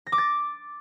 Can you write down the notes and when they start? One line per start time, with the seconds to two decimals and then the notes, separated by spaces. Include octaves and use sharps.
0.07 A#6
0.12 D6
0.18 A6